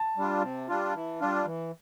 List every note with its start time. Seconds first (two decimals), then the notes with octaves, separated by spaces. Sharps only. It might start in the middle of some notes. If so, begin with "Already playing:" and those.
Already playing: A5
0.17 G3 D4 F4
0.42 C3
0.69 G3 D4 F4
0.94 E3
1.20 G3 D4 F4
1.46 E3